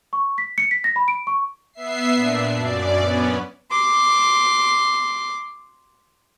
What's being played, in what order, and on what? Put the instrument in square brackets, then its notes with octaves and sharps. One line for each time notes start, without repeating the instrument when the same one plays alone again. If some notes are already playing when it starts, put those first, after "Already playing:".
[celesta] C#6
B6
C#7
B6
A#6
B5
D7
C#6
[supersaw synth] B3 E5 C7
A#2 D4
F#2 D5
B3 C#4
[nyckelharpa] C6 D6